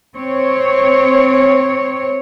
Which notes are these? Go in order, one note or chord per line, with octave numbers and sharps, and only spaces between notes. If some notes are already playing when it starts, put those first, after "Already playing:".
C4 C#5